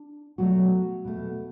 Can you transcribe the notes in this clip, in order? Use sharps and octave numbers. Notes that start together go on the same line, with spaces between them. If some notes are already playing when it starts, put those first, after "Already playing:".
Already playing: D4
B2 F#3 A3 F#4
B2 A3